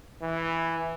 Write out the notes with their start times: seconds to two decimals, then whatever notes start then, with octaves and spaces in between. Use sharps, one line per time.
0.22 E3